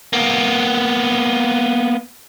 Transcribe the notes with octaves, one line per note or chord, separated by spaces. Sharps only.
A#3 B3